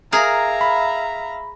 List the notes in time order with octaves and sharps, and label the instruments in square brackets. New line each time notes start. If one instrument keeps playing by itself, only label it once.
[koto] G#4 A#4 [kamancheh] E5 F5 [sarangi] A#5
[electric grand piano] B5